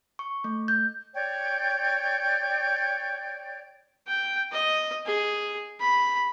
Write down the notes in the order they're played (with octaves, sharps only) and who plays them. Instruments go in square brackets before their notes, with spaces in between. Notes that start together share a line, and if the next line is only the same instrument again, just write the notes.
[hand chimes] C#6
A3
G6
[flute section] C#5 D5 G5
[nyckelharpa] G5
D#5
G#4
B5